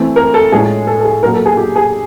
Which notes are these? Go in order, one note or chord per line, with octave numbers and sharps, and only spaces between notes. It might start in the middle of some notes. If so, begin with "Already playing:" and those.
Already playing: E3 A3 C4
A#4
A4
A2 F3 G#3 C#4 G#4
A4
A4
G#4
A#2 F#3 B3 A#4
A4
G#4
G4
G#4